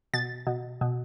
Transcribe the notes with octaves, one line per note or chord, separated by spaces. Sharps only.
B2 A6
B2
B2